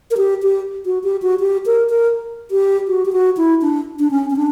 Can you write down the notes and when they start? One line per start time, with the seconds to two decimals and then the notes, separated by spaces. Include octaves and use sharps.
0.11 A#4
0.17 G4
0.43 G4
0.86 F#4
1.04 G4
1.22 F#4
1.40 G4
1.66 A#4
1.90 A#4
2.51 G4
2.88 F#4
3.05 G4
3.13 F#4
3.37 E4
3.62 D4
3.99 D4
4.11 C#4
4.30 C#4
4.36 D4